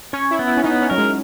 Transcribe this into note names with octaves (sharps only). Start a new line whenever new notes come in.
C#4 C#5
E4
B3
E4
C#4
B3 D#4
C#4
F#3 A#4
G#3